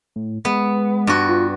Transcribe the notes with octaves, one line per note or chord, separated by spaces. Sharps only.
A2
G#3 B3
G2 F#4
F4